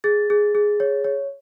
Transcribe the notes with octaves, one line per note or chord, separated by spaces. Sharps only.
G#4 A6
G#4
G#4
C#5
C#5